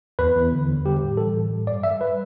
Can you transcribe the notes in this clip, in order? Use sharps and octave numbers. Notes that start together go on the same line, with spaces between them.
E2 B4
E2
D3
D3
G3 G4
A2
E3 A4
A2
G3
G2 D5
G3 E5
G3 B4